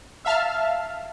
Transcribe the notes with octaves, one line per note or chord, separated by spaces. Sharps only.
E5 F5 A5 F6